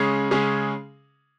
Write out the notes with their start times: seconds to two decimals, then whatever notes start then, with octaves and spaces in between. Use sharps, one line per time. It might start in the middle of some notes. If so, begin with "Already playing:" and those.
Already playing: C#3 G#3 C#4 G#4
0.31 C#3 G#3 C#4 G#4